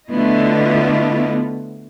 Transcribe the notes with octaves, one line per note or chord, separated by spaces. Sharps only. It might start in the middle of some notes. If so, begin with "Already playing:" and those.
D3 A3 B3 E4 F4 D#5